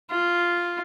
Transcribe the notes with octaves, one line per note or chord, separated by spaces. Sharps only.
F4